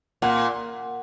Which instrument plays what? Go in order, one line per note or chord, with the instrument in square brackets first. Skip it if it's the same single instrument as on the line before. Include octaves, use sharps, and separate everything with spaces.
[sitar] A#2 [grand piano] F#5